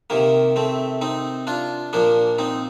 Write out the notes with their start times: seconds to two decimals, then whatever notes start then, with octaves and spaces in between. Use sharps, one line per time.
0.10 C3 D#3 A#3
0.56 A3 C4
1.01 C4 D#4
1.47 D4 F4
1.93 A#2 F3 A#3 D4
2.38 C4 D#4